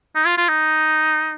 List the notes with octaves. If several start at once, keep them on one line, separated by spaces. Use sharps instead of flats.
D#4
F4
F4
D#4